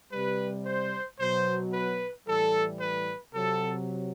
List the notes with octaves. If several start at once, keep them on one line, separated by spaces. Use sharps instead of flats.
C3 G3 B4
C5
B2 F#3 C5
B4
A2 E3 G3 A4
B4
C3 F#3 A4